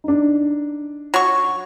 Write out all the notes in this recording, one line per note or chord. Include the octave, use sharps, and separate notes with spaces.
D4 D#4
F#3 C#6